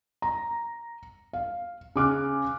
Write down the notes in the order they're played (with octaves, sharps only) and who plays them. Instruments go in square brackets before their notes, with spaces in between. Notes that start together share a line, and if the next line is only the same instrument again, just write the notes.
[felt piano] A#5
F5
C#3 D6 F6 F#6